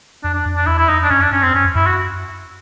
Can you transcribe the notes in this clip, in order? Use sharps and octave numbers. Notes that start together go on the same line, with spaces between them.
F2 D4
D4
F2
D4
E2 E4
E4
F2 D#4
D4
F#2 C#4
D4
F#2 C#4
C4
F#2 C#4
F2
F#2 E4
F#4